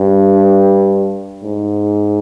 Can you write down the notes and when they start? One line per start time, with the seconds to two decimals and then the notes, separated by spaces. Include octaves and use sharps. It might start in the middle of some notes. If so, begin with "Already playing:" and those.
Already playing: G2
1.43 G#2